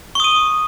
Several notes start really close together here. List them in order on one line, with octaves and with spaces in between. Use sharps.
C#6 D#6 D#7